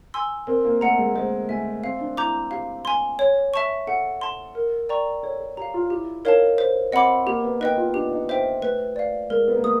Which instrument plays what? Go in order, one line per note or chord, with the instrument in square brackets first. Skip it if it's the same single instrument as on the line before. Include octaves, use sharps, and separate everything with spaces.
[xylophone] G#5 C6 E6
[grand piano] C4 [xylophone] A#4
[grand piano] A#3
[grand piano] A3 [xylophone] D#5 F#5 A#5
[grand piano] G#3
[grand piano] G#3 [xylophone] C5
[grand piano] A3 [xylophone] E5 G#5
[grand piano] C4 [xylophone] F5
[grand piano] D4
[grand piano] E4 [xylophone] A#5 D6 G6
[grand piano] G4 [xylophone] F5
[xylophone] G#5 C6
C#5
E5 A5 C#6
[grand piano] A4 [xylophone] F#5
[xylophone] A5 C6
A#4
D5 G5 A#5 C#6
[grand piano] A4 [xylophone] C#5
[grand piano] A4
[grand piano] G4 [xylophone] F5 A#5
[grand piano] F4
[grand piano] E4 [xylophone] G4
[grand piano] D#4 [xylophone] A#4 C#5 F5 A5
[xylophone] C5
[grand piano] C4 [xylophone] D#5 F#5 B5 D6
[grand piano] A#3 [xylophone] G4
[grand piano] B3
[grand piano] D#4 [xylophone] B4 D#5 G5
[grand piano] F4
[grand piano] D4 [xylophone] G4
[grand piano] D#4
[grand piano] D#4 [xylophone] C5 E5 G5
[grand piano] A3 [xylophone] B4
[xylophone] D5 F5
[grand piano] G#3 [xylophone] A#4
[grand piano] B3
A#3
[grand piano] A3 [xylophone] D#6